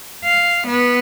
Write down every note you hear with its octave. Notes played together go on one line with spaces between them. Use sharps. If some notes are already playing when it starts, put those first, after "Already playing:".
F5
B3